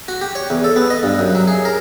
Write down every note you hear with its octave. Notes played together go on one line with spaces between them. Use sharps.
F#4
G4
C#5
E2
A4
B3
D#5
G2
F#2
F#3
G#4
A#4